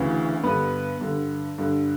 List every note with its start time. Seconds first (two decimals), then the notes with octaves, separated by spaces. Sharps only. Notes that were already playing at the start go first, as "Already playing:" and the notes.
Already playing: D2 C#3 E3 C#4
0.43 G2 D3 B3 B4
1.01 G2 D3
1.58 G2 D3